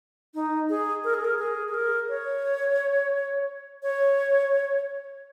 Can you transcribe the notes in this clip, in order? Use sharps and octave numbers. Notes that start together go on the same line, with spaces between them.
D#4
G#4
A#4
G#4
A#4
G#4
G#4
A#4
C#5
C#5